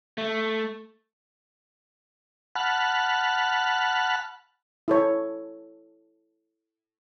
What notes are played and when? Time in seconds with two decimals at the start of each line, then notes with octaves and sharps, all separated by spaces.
0.18 A3
2.55 F#5 A5 B5 F6 F#6
4.88 E4 A4 C#5